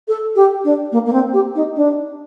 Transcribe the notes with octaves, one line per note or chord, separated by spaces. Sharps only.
A4
G4
D4
A#3
A#3
C4
G4
D#4
D4